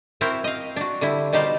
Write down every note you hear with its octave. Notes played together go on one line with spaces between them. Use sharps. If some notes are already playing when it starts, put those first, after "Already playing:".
C4 E4 F#4 A#4 C5
D#5 F5
D4 F#4
D3 G3 E4
B2 G3 D#4 C5 D5 F5